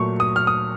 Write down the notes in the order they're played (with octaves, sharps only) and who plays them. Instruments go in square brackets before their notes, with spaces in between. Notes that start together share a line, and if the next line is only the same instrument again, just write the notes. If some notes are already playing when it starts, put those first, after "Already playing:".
Already playing: [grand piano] A#2 F#3 A3 C#6
D#6
F6
D#6